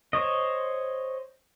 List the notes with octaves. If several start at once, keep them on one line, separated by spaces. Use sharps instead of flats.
C5 C#5 D#5